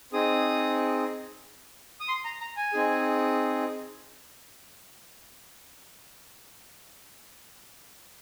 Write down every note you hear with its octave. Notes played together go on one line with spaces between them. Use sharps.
C4 D#4 G#4 D#6
D#6
C6
A#5
A#5
G#5
C4 D#4 G#4